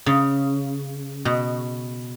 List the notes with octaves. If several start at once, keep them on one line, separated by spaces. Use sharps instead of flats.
C#3
B2